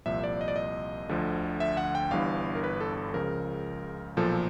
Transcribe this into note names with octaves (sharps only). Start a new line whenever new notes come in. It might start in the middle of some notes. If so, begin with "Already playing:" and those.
C2 A#2 F3 E5
D5
D#5
D5
D#5
D2 D3 F3
E5
F#5
G5
G1 G2 E3 F5
A#4
B4
A4
A4
C#2 C#3 F3 A#4
B1 A#2 F3 A4